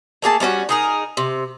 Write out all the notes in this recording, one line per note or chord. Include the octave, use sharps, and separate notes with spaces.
A3 A#3 G#4 A5
G3 A3 C#4 F#4
D#4 G#4 A#4
C3